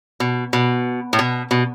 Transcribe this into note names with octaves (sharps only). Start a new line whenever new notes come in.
B2
B2
A2
B2
B2